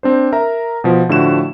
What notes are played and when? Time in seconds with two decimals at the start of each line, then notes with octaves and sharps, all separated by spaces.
0.03 C4 D4 C5
0.32 A#4 E5 A#5
0.84 B2 F3
1.09 A2 D3 F3 F#4 E7